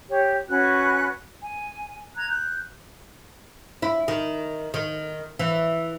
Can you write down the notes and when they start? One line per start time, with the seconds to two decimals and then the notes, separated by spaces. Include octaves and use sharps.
0.08 G4 C#5
0.49 C#4 F#4 B4 F#6
1.42 G#5
2.16 A#5 F#6 G#6
2.28 F#6 G6
3.82 E4
4.08 D#3
4.74 D#3
5.39 E3